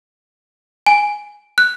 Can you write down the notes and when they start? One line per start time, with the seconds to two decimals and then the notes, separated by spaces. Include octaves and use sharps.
0.86 G#5
1.58 F#6